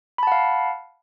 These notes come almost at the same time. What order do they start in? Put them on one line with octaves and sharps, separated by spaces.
B5 A5 F#5 F5